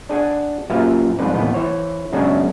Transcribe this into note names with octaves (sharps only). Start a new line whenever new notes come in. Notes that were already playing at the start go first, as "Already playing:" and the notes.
D4 G#4 F#5 G#5
F#2 A#2 G4 B4 E5 F5
C2 F2 G#2 B4 D5
A1 D#2 A2 B3 B4 G5
E3 C5 C#5
F#2 C#3 F#3 G#3 B3 D4